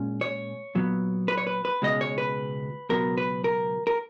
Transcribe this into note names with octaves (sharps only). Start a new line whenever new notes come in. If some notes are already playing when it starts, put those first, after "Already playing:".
Already playing: A#2 G#3 C#4
C#5
A#2 F#3 B3
B4
C#5
B4
B4
C#2 B2 G#3 C#4 D#5
C#5
B4
C#2 B2 F#3 B3 A#4
B4
A#4
A#4